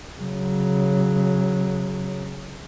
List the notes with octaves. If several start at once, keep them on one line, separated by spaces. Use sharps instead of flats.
C#3 F#3